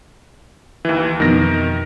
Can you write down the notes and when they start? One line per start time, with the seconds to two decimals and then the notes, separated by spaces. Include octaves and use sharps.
0.85 D#2 E3
1.20 F2 B2 D#3 A#6